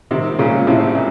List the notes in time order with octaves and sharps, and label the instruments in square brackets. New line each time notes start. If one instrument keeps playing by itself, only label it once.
[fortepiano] C3 D#3
A#2 C#3
A2 C3
A#2